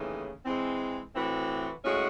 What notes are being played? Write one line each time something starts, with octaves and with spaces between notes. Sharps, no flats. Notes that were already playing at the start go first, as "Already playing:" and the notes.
Already playing: D#2 C#3 E3 A3
E3 G#3 C4
A2 E3 C4 F#4
A2 G#3 C#4 F#4